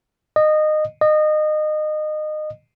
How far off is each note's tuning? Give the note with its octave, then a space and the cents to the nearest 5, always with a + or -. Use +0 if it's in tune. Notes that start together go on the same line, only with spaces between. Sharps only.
D#5 -20
D#5 -25